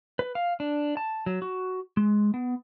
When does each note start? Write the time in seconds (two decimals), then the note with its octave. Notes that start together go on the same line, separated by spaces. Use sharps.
0.19 B4
0.35 F5
0.60 D4
0.97 A5
1.26 F#3
1.42 F#4
1.97 G#3
2.34 B3